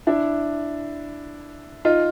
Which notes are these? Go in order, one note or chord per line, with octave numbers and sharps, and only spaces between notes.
D4 E4
D#4 F4